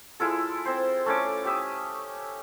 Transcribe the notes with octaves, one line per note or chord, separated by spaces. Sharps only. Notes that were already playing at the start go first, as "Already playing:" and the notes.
G#3 E4 F4 A4
C4 C5
A3 C#4 D6
G4 E5 D#6